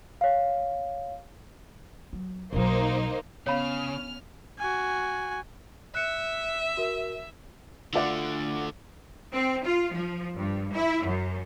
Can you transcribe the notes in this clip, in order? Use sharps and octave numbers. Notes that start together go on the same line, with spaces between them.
C#5 F5
F#3
B1 F#3 A#3 D#4 C5
C#3 B3 C#4 C#5 F5 B5 F6
F#4 G#5
E5 F#6 C#7
F#4 A#4
D3 A3 F4 D5 F#5
C4
F4
F3
G2
E4
F#2